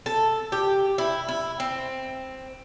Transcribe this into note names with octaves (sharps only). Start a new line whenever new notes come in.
A4
G4
E4
E4
C4